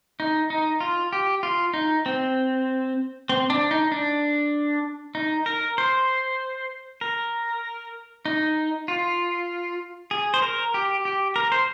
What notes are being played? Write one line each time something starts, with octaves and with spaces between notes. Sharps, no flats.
D#4
D#4
F4
G4
F4
D#4
C4
C4
D4
D#4
D4
D#4
A#4
C5
A#4
D#4
F4
G#4
C5
A#4
G4
G4
A#4
C5